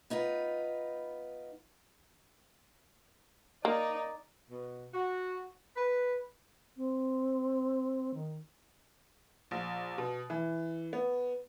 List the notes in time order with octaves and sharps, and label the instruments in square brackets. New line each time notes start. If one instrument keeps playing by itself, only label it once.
[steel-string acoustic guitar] B3 D#4 F4 B4
[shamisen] A#3 [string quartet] D#4 D5
[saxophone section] B2
F#4
B4
[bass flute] C4
D#3
[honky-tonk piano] A#1
B2
E3
B3